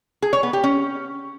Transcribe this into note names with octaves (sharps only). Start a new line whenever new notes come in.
G#4
C#5
B3
G4
C#4